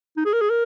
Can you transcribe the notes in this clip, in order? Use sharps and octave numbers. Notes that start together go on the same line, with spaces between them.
D#4
G#4
A#4
G#4
A#4